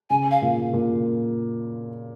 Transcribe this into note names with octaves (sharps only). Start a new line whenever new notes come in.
C#3 G#5
F5
A#2
A#2